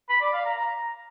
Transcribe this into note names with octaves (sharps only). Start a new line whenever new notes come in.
B5
D5
F5
A#5
A#5